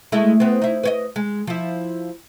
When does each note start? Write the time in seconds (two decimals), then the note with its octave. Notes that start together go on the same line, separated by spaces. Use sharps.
0.12 G#3 A3 E4
0.40 B3 C4
0.62 D#4 E4
0.83 B4 C#5 D#5
1.16 G#3
1.47 F3 E4